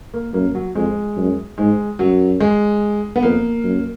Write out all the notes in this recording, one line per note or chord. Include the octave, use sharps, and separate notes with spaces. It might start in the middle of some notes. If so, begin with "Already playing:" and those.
A#3
F#2 A#3
F#3
F2 G#3
F#2
G#2 G#3
F#2 F#3
G#3
B3
F2 A#3
F#2